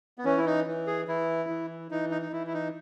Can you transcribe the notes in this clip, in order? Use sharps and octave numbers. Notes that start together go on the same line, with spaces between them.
B3
E3 C#4
E4
D#4
E3
G#4
E3 E4
E3
E3 D#4
D#4
D#4
E3 E4
E4
D#4